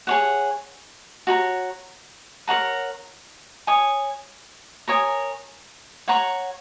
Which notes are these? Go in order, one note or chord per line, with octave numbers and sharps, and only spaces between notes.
G#4 C#5 F#5
F#4 C#5 A#5
A#4 C#5 F#5 A#5
C#5 G#5 D#6
A#4 C#5 G#5 D#6
C#5 F#5 A#5 C#6